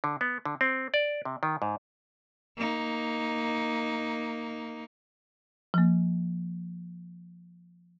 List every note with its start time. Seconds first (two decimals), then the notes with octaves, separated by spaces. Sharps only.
0.04 D3
0.21 B3
0.45 D3
0.61 C4
0.94 D5
1.25 C3
1.43 D#3
1.62 G#2
2.57 A#3 D#4
5.74 F3 A#3